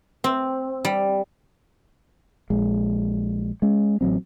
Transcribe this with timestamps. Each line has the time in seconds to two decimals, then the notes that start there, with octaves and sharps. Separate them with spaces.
0.24 C4
0.85 G3
2.50 A#1 G#3
3.62 G#3 C#4
4.01 A1 D#3 F#3 C4